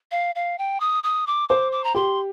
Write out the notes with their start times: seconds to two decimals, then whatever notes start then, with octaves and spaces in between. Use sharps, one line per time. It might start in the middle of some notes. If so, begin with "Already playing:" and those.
0.11 F5
0.35 F5
0.58 G5
0.80 D#6
1.04 D#6
1.27 D6
1.49 C5 D6
1.72 D6
1.84 A#5
1.95 G4 C6